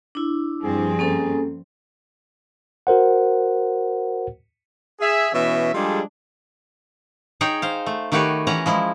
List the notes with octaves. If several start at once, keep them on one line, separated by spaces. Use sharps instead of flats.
D4 E4
G2 F3 G3 C4 G#4
A#3 C#4 A4
F#4 A#4 C5 F#5
G#4 E5
B2 E3 C#4 E5
F3 G3 G#3 D4 G#4 A4
D#4 G#4 C#5 G5
C5 F5
A3
D#3 A3 F#4 G4 B4 C#5
E3 C#4 C#5 F#5 A#5
F3 G#3 E4